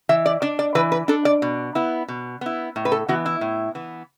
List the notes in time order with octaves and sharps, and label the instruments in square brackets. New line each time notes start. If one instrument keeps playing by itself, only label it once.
[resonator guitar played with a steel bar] E3 E5
D5
D4 D5
D5
E3 B4
B4
D4 A4
D5
B2
B3 E4
B2
B3 E4
A2
B4
A4
E3 B3 F#4
E4
A2
E3 B3